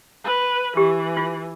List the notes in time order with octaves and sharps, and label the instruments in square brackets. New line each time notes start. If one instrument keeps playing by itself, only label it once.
[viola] B4
[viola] E3 [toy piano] G4
[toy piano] F4